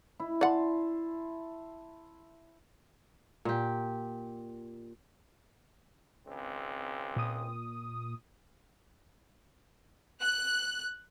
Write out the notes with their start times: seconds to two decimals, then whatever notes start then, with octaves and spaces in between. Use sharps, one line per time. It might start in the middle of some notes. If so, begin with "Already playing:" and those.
0.20 E4
0.41 D5 F#5 A5 C6
3.45 A#2 G4
6.26 G#1 C#2 C4
7.16 A#2 D#6
10.22 F#6